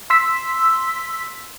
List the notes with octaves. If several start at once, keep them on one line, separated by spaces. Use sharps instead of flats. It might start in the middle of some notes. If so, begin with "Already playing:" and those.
C6 E6 B6